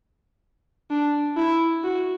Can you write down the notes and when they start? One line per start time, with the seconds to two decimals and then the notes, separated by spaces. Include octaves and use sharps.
0.91 D4
1.37 E4
1.84 F#4